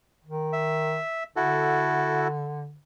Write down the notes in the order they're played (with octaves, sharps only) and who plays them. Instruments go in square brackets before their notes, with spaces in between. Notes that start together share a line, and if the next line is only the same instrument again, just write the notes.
[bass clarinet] D#3
[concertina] E5
[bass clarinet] D3 [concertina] E4 F#4 A4